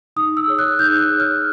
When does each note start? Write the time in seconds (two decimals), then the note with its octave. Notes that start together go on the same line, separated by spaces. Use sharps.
0.16 D#4 D#6
0.37 E6
0.48 G#4 C#5
0.59 F#6
0.79 D#4 G6
0.99 F#6
1.09 G#4 C#5
1.20 F6